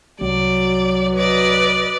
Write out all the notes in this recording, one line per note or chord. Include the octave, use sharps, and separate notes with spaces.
C2 F#3 D5
B4 D5 D#5